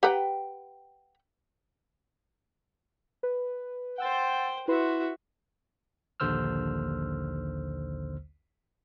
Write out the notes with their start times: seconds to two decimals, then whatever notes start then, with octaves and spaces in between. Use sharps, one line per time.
0.03 G4 B4 F#5 G5 A#5
3.23 B4
3.98 C5 F#5 G5 E6 A6
4.68 E4 F#4 B4 E5 C6
6.20 A#1 D#2 D3 C5 E6 F6